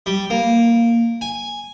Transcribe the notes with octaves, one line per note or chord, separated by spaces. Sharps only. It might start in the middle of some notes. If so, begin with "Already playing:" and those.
G3
A#3
G#5